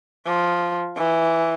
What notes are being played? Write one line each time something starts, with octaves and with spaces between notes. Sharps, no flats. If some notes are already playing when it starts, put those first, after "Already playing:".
F3
E3